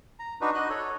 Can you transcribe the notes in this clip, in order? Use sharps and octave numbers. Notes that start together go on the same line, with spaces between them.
A#5
D4 D#4 F#4 B4
F#4 D#5 F#6
A4 C#5